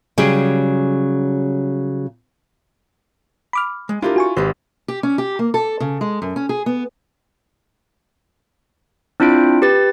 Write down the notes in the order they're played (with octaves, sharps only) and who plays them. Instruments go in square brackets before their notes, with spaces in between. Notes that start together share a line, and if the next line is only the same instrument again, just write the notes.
[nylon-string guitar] C#3 F#3 G3 G4 G#4
[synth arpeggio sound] B5 D6 F6
[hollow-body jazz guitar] G#3
[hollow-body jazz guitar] D4 G4 A#4 [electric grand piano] E4 F4
[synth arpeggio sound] F#4 G#5 C#6
[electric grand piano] G#1 [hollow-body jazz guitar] G4 B4 C5
[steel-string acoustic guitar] G4
C#4
G4
A#3
A4
C#3
G#3
F#2
C#4
G#4
B3
[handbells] C4 D4 E4 F4 D7
G4 B4 A6